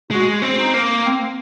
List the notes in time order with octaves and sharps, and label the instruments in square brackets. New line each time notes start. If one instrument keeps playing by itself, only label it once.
[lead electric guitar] G#3 [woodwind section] F#4
[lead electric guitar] C4
[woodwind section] D#4
[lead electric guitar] A#3
[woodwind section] C4